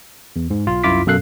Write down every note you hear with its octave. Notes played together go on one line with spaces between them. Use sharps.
E2
G#2
B1 F4
C2 F#2 E4 F4 D6 B6
F#2 B2 A4 F5 F#6 C7